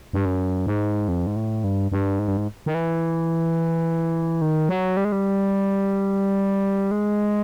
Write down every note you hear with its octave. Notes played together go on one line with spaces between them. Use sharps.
G2
F#2
G#2
F2
G#2
A2
G2
G2
G#2
G2
G#2
D#3
E3
D#3
F#3
G3
G#3
G3
G#3